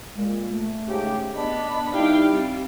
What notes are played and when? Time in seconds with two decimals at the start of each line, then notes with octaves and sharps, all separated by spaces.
0.16 A#2 G#3
0.50 A3
0.88 G#2 C#3 G4
1.35 B3 D4 D#5 B5
1.94 G2 D#4 E4 G4 F5 G5
2.32 G3 C4